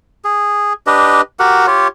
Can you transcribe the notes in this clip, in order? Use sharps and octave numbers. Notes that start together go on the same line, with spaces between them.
G#4
D4 G4 B4 D#5
F#4 G4 A#4 F#5
F4 G4 C#5